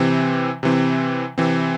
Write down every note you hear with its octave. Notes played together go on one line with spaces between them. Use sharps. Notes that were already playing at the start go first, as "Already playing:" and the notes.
Already playing: C3 E3 C4
C3 E3 C4
C3 E3 C4